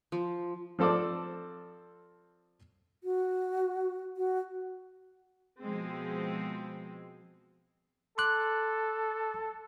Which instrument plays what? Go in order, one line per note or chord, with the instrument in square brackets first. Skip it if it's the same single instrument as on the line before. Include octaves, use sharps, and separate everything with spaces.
[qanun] F3
[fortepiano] F3 C4 A4 C5 D5
[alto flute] F#4
F#4
[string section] B2 F3 G#3 C4
[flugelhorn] A4 [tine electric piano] C6 D6 F#6